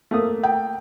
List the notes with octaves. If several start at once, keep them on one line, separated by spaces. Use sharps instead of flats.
A3 A#3 D#6
G5